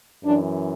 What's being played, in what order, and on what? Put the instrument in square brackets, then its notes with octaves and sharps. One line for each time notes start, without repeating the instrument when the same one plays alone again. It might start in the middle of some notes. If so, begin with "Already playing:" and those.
[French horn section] F#2 E3 D4